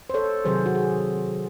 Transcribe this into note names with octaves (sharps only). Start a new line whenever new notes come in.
C5
A4 C#5
C3 D#3 F#3 G#4 C5
F#4
G#4